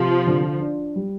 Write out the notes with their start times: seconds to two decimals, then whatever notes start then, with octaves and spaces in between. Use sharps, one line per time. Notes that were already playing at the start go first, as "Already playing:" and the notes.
Already playing: C3 F3
0.27 D3
0.61 D4
0.96 G3